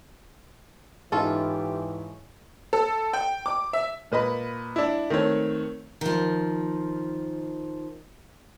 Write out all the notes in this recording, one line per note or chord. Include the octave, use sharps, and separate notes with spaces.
G#2 E3 C#4 E4 F4 G4 A4 D#5
A4
G5
D6
E5
A#2 B4 D#5 B5
D4 E4
D#3 A3 C4 C#5
D#3 F3